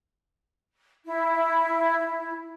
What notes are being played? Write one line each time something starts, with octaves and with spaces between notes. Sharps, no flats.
E4